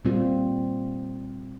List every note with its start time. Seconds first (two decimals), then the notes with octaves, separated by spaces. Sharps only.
0.05 A#2 G3 C4 F4